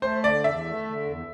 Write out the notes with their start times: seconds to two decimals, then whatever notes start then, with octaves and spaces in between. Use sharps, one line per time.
0.02 A3 C5
0.23 D3 D5
0.44 E2 E5
0.65 A3
0.85 D3
1.05 E2